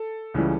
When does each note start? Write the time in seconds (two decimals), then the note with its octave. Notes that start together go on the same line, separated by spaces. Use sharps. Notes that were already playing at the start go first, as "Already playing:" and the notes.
Already playing: A4
0.34 C#2 C#3 E3 G3